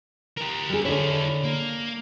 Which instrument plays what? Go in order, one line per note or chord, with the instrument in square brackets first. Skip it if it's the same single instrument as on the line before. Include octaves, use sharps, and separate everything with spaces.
[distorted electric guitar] G4 A#4
[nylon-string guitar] G3 G#4
[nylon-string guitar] D3 D4 C#5 [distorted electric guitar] E4 G#4
[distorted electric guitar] A#3